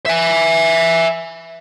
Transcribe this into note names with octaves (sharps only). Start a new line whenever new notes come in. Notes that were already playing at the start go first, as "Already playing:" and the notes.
E5 G#5